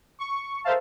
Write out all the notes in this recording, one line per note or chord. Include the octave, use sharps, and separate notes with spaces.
C#6
A4 A#4 C5 E5 F5 A5